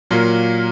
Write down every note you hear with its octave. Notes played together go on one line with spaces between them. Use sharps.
A#2 F#3 A#3 F4